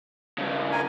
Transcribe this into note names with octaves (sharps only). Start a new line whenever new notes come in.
G2 C#3
A#4 G#5